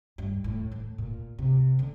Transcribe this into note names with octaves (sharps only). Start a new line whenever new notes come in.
G2
A2
A2
A#2
C3
D3